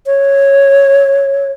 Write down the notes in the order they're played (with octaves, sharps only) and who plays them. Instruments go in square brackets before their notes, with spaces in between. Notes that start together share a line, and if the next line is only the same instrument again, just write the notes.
[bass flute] C#5